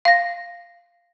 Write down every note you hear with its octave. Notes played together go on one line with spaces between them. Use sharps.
F5 A#6